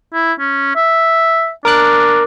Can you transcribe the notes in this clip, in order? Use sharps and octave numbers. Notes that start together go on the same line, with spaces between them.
E4
C#4
E5
D4 A#4 D6 F#6